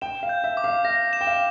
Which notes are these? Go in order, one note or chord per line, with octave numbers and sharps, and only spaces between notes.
G5 E7
F5
G6
E5
D6
F5
F5 A#6
E7
G5
F5